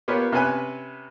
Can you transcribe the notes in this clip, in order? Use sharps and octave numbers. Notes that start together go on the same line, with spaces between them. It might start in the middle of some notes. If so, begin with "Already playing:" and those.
A#3 B3 F4 G4 B4 C#5
C3 C#4 B4 G#5 F#6